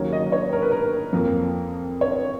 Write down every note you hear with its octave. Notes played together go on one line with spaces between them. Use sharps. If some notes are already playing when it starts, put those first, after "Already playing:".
Already playing: D#2 C#3 F#3 A#3 C#5
D#5
C#5
A#4
B4
A#4
F2 F3 A#3
C#5